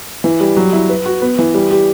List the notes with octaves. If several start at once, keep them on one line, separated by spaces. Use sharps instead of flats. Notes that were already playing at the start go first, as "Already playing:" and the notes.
E3
G3
F#3
E4
B4
F#4
B3
E3
G3
G4